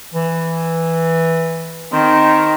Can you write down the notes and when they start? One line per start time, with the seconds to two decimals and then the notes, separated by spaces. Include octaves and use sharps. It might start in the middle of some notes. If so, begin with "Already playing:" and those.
0.14 E3
1.92 D#3 C4